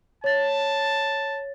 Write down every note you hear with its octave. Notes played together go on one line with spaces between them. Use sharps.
C#5 A5 A6